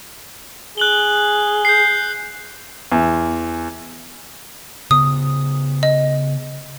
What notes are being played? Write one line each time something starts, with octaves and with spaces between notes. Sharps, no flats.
G#4 F#6 F#7 G7
G6 C7
E2
C#3 B3 D#6
D#5